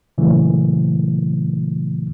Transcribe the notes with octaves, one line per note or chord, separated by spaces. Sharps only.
A#2 C#3 E3 F#3 A3